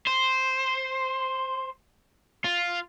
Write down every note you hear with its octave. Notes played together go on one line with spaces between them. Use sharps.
C5
F4